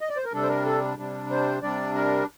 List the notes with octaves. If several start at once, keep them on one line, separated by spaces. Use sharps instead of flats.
D#5
D5
C5
A#4
C3 G3 D4 A4
C5
A#4
A4
C3 G3 D4
C5
C3 G3 D4 D5
A#4